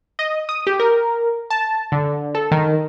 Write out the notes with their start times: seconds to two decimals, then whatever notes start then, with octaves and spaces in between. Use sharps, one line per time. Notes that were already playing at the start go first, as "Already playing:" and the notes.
0.19 D#5
0.49 D#6
0.67 G4
0.80 A#4
1.50 A5
1.92 D3
2.35 A4
2.51 D#3